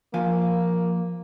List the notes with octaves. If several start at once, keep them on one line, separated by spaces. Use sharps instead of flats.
F3 A#3 F5 G#5